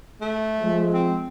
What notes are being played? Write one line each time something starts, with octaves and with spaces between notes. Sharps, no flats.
A3
F3 G#3
C4